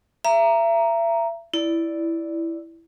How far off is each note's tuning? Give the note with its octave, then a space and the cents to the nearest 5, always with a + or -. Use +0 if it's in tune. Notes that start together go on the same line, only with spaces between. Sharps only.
E5 +35 A#5 +0
E4 +0 D5 +0